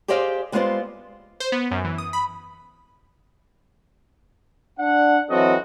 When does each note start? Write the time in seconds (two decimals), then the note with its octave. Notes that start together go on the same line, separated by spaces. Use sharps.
0.08 G4 G#4 C5 D5 D#5 F5
0.52 G3 G#3 B3 F4 C5 D5
1.40 C5
1.52 B3
1.71 F#2
1.85 E3
1.98 D#6
2.13 B5
4.79 D4 F#5
5.30 E3 F#3 C4 F#4 A4 D#5